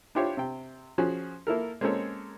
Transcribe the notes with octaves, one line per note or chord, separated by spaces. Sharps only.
D4 E4 F4 G4 C5 C#5
C3 G5
F3 C#4 F#4 G#4
A#3 E4 A4 A#4
G#3 A#3 C4 C#4 A4 C#5